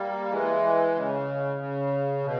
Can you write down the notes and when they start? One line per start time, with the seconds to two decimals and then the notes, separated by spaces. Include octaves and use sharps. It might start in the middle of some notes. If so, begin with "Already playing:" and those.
Already playing: G3 A#3
0.31 E3 G#3
0.95 C#3
1.59 C#3
2.24 B2